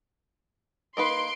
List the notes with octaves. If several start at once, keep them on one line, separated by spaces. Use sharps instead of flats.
A#3 D#4 B4 C6 D7